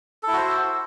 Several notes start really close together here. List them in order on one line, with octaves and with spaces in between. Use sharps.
A4 E4 F#4 C5